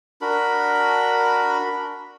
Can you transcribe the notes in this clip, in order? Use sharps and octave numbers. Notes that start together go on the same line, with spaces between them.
D4 F#4 A#4 B5